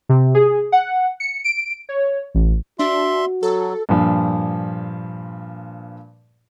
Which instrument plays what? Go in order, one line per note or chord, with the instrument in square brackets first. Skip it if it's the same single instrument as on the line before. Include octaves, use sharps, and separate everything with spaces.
[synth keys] C3
G#4
F#5
C#7
D7
C#5
A1
[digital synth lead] D4 [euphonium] F#4 [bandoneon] E5 C6
[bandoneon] F#3 [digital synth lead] A4
[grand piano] G2 A#2 F3